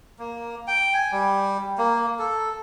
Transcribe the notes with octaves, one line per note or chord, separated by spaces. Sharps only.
A#3
G5
G#5
G3
A#3
A4